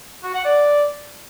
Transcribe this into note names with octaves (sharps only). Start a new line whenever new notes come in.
F#4
F#5
D5